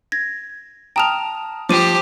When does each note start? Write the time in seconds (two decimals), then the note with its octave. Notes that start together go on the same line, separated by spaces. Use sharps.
0.12 G#6 A#6
0.96 G5 A5 A#5 D#6 F6 F7
1.69 F3 G4 C5 D6 D#7